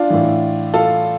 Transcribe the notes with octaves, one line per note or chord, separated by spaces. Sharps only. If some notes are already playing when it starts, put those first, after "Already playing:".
Already playing: D4 F4
A2 E3
F4 A4